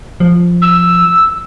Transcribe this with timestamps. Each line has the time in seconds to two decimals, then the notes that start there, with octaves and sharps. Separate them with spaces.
0.20 F3
0.62 E6